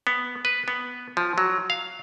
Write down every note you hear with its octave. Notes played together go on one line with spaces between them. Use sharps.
B3
B4
B3
F3
F#3
F5